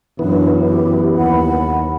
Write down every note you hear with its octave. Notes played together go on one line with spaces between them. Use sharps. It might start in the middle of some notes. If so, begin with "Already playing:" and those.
F#2 E3 B3 D4
G4
D#2 F#5 B5